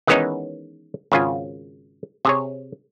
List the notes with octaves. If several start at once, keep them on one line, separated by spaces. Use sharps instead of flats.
D#3 E3 G#3 B3 C#4 D#4
G#1 C#3 F4 G#5
C3 G#4 C#5